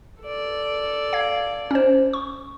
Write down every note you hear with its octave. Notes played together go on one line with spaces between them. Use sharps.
A4 D5
F5 G#6
C#4 C5
C#6